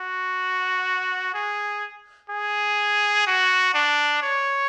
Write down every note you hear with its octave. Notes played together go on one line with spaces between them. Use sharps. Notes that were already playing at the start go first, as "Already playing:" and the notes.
Already playing: F#4
G#4
G#4
F#4
D4
C#5